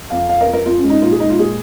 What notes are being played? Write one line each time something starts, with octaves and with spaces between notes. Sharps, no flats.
F2 F5
F2 F5
A#4
F2
A#4
F2 F4
C#4
G#3
D#4
A#2 F4
G#4
G#3 D#4
F4
A#2 G#4